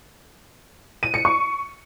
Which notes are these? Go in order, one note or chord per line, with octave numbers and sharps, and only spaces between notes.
D#7
C#7
C#6